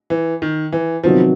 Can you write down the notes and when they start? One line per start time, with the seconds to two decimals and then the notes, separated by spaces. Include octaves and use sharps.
0.10 E3
0.42 D#3
0.72 E3
1.03 C3 D#3 F3 F#3 B3